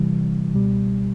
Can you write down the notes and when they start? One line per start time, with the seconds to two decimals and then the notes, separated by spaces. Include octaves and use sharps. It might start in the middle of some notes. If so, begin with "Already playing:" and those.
Already playing: C3 E3 G3
0.53 C#2 B2 G3